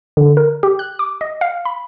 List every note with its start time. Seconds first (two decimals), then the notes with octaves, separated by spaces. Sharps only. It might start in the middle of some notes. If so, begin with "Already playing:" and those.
0.17 D3
0.37 A#4
0.63 G4
0.79 F#6
0.99 D6
1.21 D#5
1.41 F5
1.65 B5